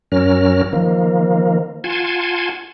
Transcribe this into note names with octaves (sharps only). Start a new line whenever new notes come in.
F#2 F#3 C#4 A#4 F6
D#3 F3 A#3
F4 F#5 G#5 A5 C6 G#6